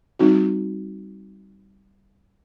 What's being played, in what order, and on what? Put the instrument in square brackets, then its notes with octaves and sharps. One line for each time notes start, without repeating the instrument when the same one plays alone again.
[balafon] G3 C4 D#4 F#4